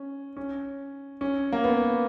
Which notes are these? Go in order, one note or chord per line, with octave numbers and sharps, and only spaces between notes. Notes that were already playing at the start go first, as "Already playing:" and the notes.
Already playing: C#4
C#4
C#4
A#3
B3